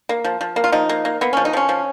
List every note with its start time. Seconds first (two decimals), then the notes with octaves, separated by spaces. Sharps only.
0.09 A#3
0.24 F3
0.41 F3
0.56 A#3
0.64 F4
0.72 F3 D#4
0.89 A#3
1.05 A#3
1.21 A#3 B3
1.33 F3 C#4
1.45 D#4
1.53 F3 C#4
1.69 F3